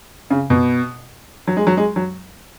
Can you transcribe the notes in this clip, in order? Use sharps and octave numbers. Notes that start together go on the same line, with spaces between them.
C#3
B2
F#3
G#3
F#3
G#3
F#3